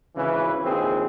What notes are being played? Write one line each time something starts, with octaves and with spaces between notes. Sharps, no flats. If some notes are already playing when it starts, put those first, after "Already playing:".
G#1 C#3 E3 B4
A#1 D#2 C4 G#4